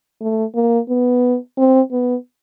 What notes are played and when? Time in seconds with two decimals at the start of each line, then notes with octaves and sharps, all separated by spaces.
0.21 A3
0.55 A#3
0.89 B3
1.58 C4
1.92 B3